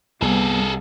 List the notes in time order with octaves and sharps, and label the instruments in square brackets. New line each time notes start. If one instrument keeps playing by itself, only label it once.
[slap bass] C2 [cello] G3 [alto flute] B3 [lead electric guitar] G#4 A4